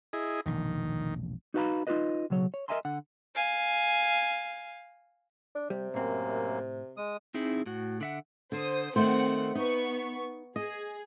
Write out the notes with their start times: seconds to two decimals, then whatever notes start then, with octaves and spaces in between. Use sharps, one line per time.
0.13 E4 G#4 D#5
0.46 E1 A#1 D#3
1.54 D#4 F#4 B4 F5 A#5 B5
1.87 D#4 F4 G4 G#4 B4 D#5
2.30 B1 C#3 F#3 C#5
2.54 C#5
2.68 A#4 D#5 E5 G#5 A#5 C6
2.85 D3 F#5
3.35 F5 G#5
5.55 D4
5.70 C3 G3
5.94 F#2 A2 A#3 C4
6.97 G#3 D#6
7.34 C4 D#4 E4 G#4
7.66 A2 F#4
8.01 D3 E5 F#5
8.52 D3 C5 D#6
8.96 D#3 A3 C4 C5 F#5
9.55 B3 D#4 C#6
10.56 G#4 D#5